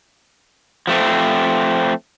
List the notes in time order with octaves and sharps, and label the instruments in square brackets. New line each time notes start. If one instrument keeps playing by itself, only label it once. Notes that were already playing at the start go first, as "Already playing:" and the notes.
[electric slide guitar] F3 A3 C4